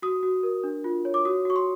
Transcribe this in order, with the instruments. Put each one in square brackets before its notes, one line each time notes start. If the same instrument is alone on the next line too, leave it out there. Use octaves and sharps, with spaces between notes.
[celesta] F#4 D#6
F#4
A#4
D4
F4
C#5
D6
F#4 D#6
F#4 C#6
C6